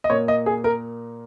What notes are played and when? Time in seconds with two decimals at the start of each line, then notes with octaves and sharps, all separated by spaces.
0.04 D#5
0.10 A#2 A#3 C#5
0.28 D#5
0.46 G#4
0.64 A#4